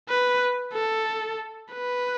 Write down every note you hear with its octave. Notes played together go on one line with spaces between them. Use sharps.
B4
A4
B4